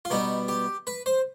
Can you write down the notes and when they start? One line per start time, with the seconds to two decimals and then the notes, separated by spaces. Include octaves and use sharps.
0.05 F4
0.10 B2 G3 B3 D#4
0.48 G4
0.87 B4
1.06 C5